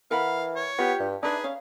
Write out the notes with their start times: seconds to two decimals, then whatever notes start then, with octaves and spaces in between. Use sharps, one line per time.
0.11 E3 A#4 F5 F#5 B5
0.56 C#5
0.78 B3 F4 G4
1.00 G2
1.23 D4 D#4 G#4 B4 E5
1.44 C#4 F5